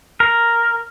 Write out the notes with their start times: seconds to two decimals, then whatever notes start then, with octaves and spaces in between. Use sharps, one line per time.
0.20 A#4